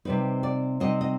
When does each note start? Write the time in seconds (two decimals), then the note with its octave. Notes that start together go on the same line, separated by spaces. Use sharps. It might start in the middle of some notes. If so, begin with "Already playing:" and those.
0.05 C3 G3 C4 D#4 B4
0.43 D5
0.80 C3 G3 C4 D#4 D#5
1.01 D#5